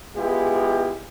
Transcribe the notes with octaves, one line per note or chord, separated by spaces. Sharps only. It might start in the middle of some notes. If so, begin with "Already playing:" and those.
G#3 B3 E4 F4 G4